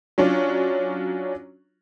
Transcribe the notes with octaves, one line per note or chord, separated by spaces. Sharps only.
F#3 C#4 D4 F4